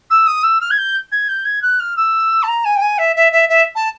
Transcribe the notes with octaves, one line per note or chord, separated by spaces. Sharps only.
E6
D#6
E6
F6
G#6
G6
G#6
G6
G#6
F#6
F6
E6
A5
A#5
G#5
G5
G#5
E5
E5
E5
E5
A5